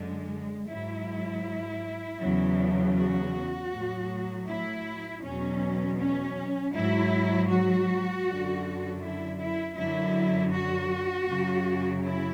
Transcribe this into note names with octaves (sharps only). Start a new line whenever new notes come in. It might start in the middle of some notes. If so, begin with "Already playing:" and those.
Already playing: F#2 D3 G#3
G#2 F#3 E4
E2 C#3 F#3
F#4
A2 F#3
E4
E2 B2 F#3 C#4
C#4
G#2 F#3 E4
F#4
F#2 D3 F#3
E4
E4
F#2 D3 F#3 E4
F#4
F#2 C#3 F#3
E4